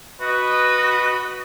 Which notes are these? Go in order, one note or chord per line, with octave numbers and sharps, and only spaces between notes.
F#4 B4 D#5